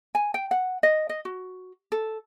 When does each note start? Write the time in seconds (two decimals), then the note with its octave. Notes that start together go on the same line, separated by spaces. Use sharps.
0.15 G#5
0.34 G5
0.51 F#5
0.83 D#5
1.09 D#5
1.25 F#4
1.92 A4